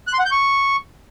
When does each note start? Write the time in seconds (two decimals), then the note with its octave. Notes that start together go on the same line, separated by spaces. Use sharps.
0.07 F#6
0.13 C6
0.19 F#5
0.25 G6
0.31 C#6